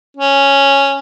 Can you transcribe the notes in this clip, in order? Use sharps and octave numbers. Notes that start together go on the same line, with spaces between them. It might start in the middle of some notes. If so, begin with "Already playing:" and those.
C#4